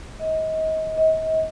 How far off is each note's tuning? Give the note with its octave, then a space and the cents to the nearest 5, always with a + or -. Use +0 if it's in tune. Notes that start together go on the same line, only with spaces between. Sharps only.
D#5 +30
D#5 +40